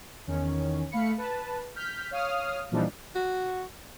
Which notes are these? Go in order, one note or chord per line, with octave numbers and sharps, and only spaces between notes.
E2 D#3 C#4
A3 F5 B5 C#7
B4 A5
F6 G6 B6
C#5 F5 D#6 F6
A#2 E3 F3 G3 D4 D#4
F#4